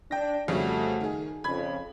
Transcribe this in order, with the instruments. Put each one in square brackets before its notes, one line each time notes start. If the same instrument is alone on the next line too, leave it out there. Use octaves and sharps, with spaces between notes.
[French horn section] D4 [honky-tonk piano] G5 A#6
[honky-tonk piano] F2 C#3 G3 [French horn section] A3 F#4
[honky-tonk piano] D#3 G#4
[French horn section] F2 C#3 [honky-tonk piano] B5 G#6